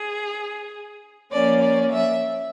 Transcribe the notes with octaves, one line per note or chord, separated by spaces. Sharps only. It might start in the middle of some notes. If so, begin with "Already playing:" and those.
Already playing: G#4
F3 A#3 C#4 D5
D5
E5